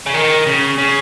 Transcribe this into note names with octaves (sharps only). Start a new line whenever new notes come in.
C#3
D#3
C#3
C#3